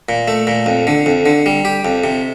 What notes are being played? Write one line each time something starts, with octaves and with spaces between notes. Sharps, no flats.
A#2
A3
A#2
F2
D3
F2
D3
G3
G4
F2
C3